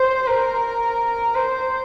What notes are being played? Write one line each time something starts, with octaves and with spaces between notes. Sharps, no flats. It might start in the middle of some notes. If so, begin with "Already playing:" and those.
Already playing: C5
A#4
C5